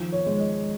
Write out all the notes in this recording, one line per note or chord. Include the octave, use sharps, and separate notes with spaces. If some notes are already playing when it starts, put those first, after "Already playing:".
Already playing: D#3 F3
C#5
G#3
D#5